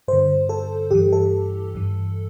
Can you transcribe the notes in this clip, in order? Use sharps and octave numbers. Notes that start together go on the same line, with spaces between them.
G2 D3 C5
A4
G2 E3 G4
A4
G2 E3